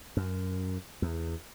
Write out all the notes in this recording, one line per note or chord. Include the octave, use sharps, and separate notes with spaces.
F#2
E2